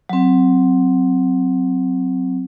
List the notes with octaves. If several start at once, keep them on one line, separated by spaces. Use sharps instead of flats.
F#3 C4